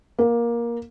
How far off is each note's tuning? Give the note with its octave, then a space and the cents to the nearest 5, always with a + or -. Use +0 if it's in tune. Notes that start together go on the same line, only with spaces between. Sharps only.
A#3 +15